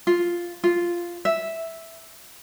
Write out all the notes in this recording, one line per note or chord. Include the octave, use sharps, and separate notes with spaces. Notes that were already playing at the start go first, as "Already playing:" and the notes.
F4
F4
E5